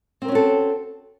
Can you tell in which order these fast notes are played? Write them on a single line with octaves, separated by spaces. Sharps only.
C4 A#4 C#4 F#4 A4